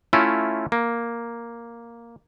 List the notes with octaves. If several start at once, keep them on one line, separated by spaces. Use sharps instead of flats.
A3 C#4 E4 F4
A#3